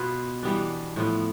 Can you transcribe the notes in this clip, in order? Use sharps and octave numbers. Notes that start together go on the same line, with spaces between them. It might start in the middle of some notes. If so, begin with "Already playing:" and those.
Already playing: B2 B3 F4 B4
E3 G3 B3 D4
A2 F3 B3